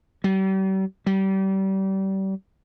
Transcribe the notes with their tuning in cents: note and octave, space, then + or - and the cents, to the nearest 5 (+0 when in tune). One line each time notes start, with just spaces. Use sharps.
G3 -40
G3 -30